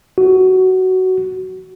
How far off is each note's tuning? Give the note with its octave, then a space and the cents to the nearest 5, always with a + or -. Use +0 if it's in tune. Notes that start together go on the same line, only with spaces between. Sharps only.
F#4 +15